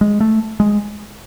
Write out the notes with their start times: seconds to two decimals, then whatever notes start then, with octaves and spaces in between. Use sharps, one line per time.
0.01 G#3
0.20 A3
0.60 G#3